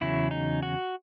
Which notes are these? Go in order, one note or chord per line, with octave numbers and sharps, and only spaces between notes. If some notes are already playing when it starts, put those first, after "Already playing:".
E2 C#3 F#3 E4
D#4
F#4